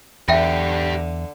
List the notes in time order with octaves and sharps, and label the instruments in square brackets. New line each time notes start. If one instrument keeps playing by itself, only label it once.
[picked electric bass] E2 [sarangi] D3 [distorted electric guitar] G4 B4 [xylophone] E5 G5 A#6